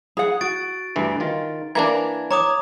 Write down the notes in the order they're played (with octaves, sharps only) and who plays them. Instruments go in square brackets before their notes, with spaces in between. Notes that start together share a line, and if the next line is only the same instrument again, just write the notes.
[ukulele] G#4 F#5
[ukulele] F#4 [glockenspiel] A6 D7
[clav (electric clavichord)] D2 G2 E3
D#3 F4
[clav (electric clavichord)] E3 A#3 D4 [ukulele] A#4 [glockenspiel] G#6
[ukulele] C#5 [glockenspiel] A#5 D6 D#6